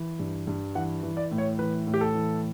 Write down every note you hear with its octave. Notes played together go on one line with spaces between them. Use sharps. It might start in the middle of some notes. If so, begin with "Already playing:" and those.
Already playing: E3
G2
G2
E3 F#5
E3
D5
A2
C#5
E3 B4
A2
G4
A4
E3